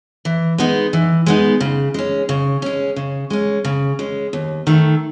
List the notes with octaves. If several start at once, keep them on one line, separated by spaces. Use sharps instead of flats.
E3
G#3 B3 D#4
E3
G#3 B3 D#4
C#3
G#3 C#4
C#3
G#3 C#4
C#3
G#3 C#4
C#3
G#3 C#4
D#2
D#3 A3